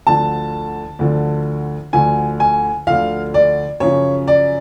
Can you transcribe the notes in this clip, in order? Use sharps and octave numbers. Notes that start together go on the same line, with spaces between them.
D2 D3 F3 A5
D2 D3 F3
D2 D3 F3 G#5
G#5
D2 D3 F3 F5
D5
F#2 C#3 F3 C#5
D5